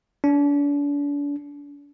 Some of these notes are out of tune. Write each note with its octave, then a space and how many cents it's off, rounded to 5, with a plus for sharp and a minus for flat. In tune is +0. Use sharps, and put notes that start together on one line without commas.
D4 -40